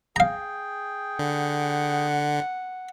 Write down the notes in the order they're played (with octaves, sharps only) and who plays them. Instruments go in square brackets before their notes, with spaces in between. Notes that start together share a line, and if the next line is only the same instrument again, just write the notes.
[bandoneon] G#4 G5 [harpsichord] F5 A#5
[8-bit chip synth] D3 [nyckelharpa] F#5